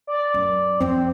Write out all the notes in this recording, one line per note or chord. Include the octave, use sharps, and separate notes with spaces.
D5
F#2
F2 F3 C4